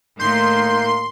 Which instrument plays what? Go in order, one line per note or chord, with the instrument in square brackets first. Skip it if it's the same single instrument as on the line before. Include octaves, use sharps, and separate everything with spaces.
[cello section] A2 D#3 A3 [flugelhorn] A#3 [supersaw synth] C6 [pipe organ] G6